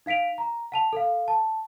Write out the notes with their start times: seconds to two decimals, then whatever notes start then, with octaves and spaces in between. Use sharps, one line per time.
0.06 D#4 F5 B6 D7 F7
0.38 A#5
0.72 F#5 A5 F7
0.93 A4 F5
1.28 A5